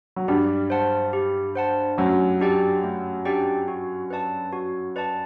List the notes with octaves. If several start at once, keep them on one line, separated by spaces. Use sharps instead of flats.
F#3
G2 G3 G4
C5 F#5 A5
G4
C5 F#5 A5
F#2 F#3 A3
D4 G4 D5 G5
A3
D4 G4 D5 G5
F#4
B4 D5 A5
F#4
B4 D5 A5